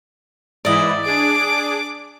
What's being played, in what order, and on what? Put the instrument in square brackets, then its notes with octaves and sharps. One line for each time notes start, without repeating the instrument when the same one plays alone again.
[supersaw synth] G#2 E3 E4 [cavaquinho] D5 D#5
[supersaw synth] D4 G#4 [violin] D6 D7